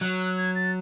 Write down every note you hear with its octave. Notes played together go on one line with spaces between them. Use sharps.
F#3 F#6
F#6
G#6
A6